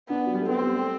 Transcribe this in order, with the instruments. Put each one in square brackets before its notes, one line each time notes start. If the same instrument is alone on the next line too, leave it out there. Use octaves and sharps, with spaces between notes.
[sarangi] B3 [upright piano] D4
[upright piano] F#3
G3
A3
[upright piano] B3 [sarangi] C4
[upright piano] G3
A3